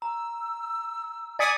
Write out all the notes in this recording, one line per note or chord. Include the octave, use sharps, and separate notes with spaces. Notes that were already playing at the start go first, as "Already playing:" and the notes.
A#5 E6
D5 G#5 D#6 A6 B6 C#7